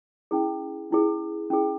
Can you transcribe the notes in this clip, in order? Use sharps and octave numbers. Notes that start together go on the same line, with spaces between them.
C#4 E4 G#4
C#4 E4 G#4
C#4 E4 G#4